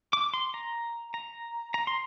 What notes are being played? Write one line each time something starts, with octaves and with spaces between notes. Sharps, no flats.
D6
C6
A#5
A#5
A#5
C6